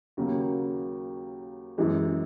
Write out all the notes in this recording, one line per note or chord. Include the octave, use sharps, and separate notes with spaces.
D#2 C#3 F#3 A#3
F#2 E3 G#3